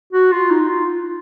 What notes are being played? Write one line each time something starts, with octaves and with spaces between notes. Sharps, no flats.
F#4
F4
D#4
F4